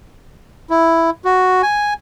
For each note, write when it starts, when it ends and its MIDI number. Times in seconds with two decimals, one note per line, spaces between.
0.70 1.10 64
1.25 1.62 66
1.63 1.94 80